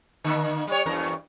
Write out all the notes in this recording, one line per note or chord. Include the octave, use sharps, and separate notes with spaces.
D3 A#3
G3 C#5
E2 G2 A#4